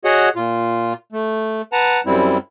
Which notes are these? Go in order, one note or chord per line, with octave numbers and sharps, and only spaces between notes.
F#4 G#4 C#5 D#5 F#5
A#2 F4
A3
B4 F#5 A5 A#5
F#2 G3 C4 E4